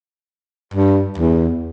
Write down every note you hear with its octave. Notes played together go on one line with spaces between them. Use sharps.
G2
E2